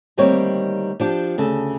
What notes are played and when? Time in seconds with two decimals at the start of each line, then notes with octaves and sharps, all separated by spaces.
0.17 D2 D#3 G3 A#3 C4 C#5
1.00 F3 D4 G4
1.38 D2 C#3 A4